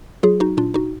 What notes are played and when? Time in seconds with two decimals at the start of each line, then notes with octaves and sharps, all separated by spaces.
0.23 F#3 F4 G#4
0.40 D#4 F#4
0.57 A#2 D4 F4
0.74 D#4 F#4